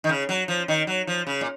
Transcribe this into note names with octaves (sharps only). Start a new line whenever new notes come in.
D#3
C#3
F#3
F3
D#3
F#3
F3
C#3
A#2